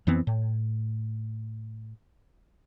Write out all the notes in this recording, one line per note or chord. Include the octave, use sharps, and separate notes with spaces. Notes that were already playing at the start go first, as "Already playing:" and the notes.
F2 E3 B3 C4
A2